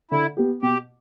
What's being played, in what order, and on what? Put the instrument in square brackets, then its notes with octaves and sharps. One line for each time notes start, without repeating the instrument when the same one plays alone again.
[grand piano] D3 [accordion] E4
[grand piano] B3 G4
[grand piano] B2 [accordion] G4